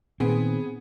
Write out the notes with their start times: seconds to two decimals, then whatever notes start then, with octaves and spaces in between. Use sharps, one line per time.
0.20 A#2 D#3 B3 C4 G#4